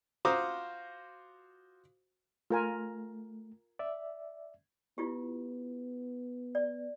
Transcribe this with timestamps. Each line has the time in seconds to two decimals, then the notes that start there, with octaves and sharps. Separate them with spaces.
0.25 F4 F#4 C5 A#5 D6 D#6
2.50 A3 F4 A#4 G#5
3.79 D5 E5
4.98 B3 E4 F4 G4
6.55 D5